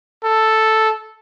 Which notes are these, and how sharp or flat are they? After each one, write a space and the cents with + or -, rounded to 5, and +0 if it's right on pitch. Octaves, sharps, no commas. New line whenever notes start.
A4 +0